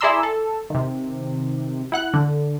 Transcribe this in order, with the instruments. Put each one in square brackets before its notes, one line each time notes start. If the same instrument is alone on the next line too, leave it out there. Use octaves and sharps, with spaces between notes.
[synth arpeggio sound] E4 G#4 D5 A#5 C6 E6
A4
C3 D#3
E4 F#5 F#6
D3